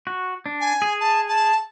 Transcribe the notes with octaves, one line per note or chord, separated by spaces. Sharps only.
F#4
D4
G#5
G#4
A5
A5